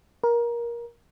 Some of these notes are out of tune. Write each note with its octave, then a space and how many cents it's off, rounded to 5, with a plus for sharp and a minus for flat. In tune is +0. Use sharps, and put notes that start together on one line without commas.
A#4 +20